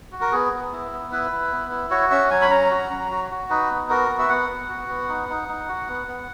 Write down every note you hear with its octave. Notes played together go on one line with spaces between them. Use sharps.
F#4
A#4
B3 G#4
B3
E4
B3
E4 B4
E4
B3
E4
F#4 C#5
C#4 E5
F#3 G#5
B5
C#4 A#5
F#4
F#3
F#4
F#4
D#4 B4
B3
F#4 A#4
B3
E5
B3 F#5
B3
F#4
B3
D#4
D#4
D#4
F#4
B3
B3